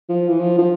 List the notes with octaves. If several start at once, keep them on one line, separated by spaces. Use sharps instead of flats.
F3
E3
F3
F3